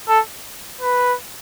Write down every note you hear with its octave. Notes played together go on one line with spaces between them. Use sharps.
A4
B4